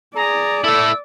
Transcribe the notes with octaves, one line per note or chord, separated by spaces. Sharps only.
G#4 D5 A#5
A3 E4 A4 E6